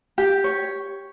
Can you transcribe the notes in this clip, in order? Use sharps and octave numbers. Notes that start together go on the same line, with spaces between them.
G4
C#5